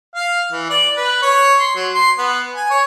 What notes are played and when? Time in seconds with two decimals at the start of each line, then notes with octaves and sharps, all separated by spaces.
0.15 F5
0.52 E3
0.70 D5
0.97 B4
1.22 C#5
1.60 C6
1.75 F#3
1.93 C6
2.18 B3
2.54 G#5
2.70 C#5